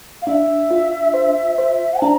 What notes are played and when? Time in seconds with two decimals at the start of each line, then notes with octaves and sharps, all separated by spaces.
0.22 F5
0.26 D4 E5
0.71 F4
1.14 C5
1.58 C5
2.02 D4 A#5